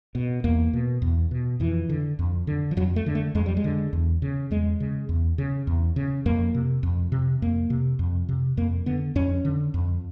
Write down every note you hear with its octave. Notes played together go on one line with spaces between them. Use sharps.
B2
E2 A#3
B2
E2
B2
F2 E3
D3
F2
D3
F3
F2 F#3
A3
D3
A3
F2 G#3
G3
G#3
D3
E2
C#3
E2 G#3
C#3
E2
C#3
E2
C#3
F2 A#3
C3
F2
C3
F2 A#3
C3
F2
C3
F2 A#3
D3 B3
F2 C#4
D3
F2